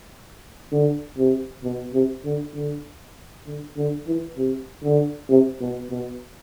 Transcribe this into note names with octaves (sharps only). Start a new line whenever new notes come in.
D3
C3
B2
C3
D3
D3
D3
D3
E3
C3
D3
C3
B2
B2